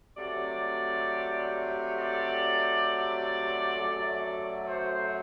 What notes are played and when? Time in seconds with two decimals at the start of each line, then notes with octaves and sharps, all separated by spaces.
0.16 C3 F#3 A3 D5
1.97 D5
3.76 F#2 F#3 A3
4.67 C5